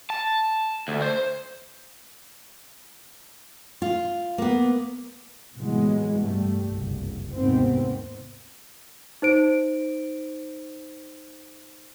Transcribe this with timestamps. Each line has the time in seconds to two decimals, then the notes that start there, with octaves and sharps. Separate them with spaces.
0.10 A5
0.88 D2
1.02 C5
3.82 F4
4.38 A#3 B3
5.57 A2 C3 E3 F#3 G#3 B3
6.21 G2 G3 A3
6.69 F#1 C2
7.35 D#2 G#2 C3 D#3 B3 C4
9.22 D#4 C5 D7